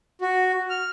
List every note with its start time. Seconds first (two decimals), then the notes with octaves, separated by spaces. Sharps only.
0.22 F#4
0.70 F6